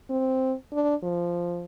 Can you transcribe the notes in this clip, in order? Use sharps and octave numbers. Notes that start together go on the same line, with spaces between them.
C4
D4
F3